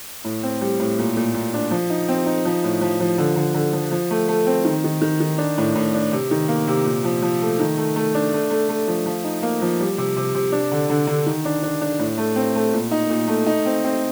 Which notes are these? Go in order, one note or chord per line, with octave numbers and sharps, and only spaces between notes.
A2
C4
G3
A2
A#2
A#2
A#2
D4
F3
D#4
C4
D#4
F3
A2
F3
F3
D3
D3
D3
F3
F3
A3
A3
C4
D#3
D#3
D#3
D#3
D4
A2
A2
D4
C3
D#3
A#3
C3
A#2
F3
F3
A3
D#3
A3
A3
D4
A3
A3
A3
F3
F3
D#4
A#3
F3
G3
C3
C3
C3
D4
D3
D3
D3
D#3
D4
D4
D4
A2
A3
C4
A3
A#2
D#4
A#2
A3
D#4
C4
C4